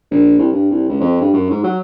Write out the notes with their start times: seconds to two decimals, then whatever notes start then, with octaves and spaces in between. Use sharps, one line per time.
0.11 A#1
0.39 C2
0.52 G2
0.71 C2
0.88 C#2
1.01 F2
1.21 G2
1.34 F#2
1.50 G#2
1.64 F#3